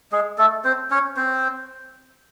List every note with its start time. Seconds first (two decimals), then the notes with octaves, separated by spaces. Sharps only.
0.12 G#3 G#4
0.38 A3 A4
0.64 C4 C5
0.91 C#4 C#5
1.17 C4 C5